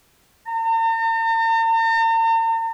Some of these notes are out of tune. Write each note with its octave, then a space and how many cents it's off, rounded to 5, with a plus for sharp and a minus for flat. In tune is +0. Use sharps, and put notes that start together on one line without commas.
A#5 -45